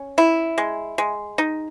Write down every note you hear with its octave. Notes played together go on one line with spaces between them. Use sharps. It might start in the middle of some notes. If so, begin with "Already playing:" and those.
Already playing: C#4
E4
G#3
G#3
D#4